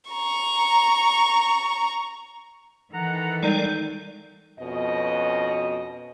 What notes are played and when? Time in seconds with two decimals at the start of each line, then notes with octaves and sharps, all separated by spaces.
0.11 A#5 C#6
2.93 D#3 E3 A4 F#5 A#5
3.43 G3 G#3 D#4 A#4 D5 G5
4.59 F2 B2 C#4 D#5